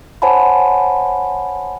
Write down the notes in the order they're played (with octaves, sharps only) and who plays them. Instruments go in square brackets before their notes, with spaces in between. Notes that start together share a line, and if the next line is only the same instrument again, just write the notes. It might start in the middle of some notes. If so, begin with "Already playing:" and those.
[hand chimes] C5 C#5 F#5 G#5 A5 B5